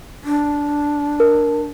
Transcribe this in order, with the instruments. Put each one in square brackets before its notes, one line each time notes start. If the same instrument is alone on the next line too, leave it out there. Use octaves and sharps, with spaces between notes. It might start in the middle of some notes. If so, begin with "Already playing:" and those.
[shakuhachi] D4
[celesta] A#4